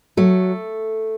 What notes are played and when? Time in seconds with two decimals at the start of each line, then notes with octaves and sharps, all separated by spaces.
0.17 F#3 A3